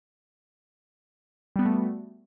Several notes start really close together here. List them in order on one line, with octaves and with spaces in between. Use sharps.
G3 B3 F#4 A3